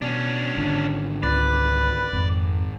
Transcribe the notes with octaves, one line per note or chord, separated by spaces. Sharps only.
B2 C#4 D4
G#1 D3
C#2 B4 D5
G#1 F2